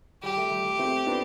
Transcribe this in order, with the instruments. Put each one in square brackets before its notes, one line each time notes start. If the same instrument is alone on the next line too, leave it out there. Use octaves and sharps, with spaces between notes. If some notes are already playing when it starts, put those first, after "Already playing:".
[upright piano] G3 [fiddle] G4
[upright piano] A3
G3
A3
A3 C4
B3 D4